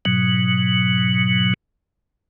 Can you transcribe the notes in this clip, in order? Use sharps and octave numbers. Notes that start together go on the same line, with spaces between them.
G#2 B2 F#3